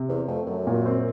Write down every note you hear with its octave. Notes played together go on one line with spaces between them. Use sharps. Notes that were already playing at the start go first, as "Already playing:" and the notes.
Already playing: C3
E2 C4
F2 A3
F#2 F#3
A#2
C4